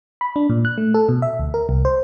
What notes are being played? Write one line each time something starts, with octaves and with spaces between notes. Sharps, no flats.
B5
D4
A#2
F#6
A3
A4
B2
E5
D2
A#4
C2
C5